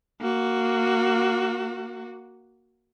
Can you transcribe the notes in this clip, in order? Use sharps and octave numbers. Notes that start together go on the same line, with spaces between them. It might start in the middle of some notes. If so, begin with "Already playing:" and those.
A#3 F#4